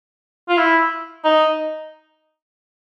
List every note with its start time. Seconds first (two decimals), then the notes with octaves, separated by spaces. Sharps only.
0.49 F4
0.57 E4
1.24 D#4